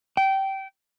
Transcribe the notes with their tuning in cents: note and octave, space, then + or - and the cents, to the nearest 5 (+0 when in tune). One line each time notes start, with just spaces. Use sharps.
G5 -20